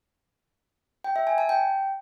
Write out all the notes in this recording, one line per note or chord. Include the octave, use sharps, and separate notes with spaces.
G5
E5
G#5
A5
G5